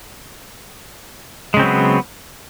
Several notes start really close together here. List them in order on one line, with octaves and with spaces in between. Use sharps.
G#3 C#3 C4 F#3 B3